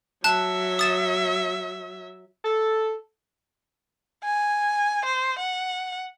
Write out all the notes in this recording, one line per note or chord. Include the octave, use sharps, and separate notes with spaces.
F#3 E5 A5 F#6
D#6 A6 E7
A4
G#5
C5
F#5